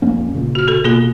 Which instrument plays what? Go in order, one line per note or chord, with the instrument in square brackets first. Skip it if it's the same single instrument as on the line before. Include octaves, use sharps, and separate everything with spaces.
[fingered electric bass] F2 A#3 C#4
A#2 C#3
[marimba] F#4 F6
F#4 A4
[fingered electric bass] B2 [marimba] A#3 F4 G#4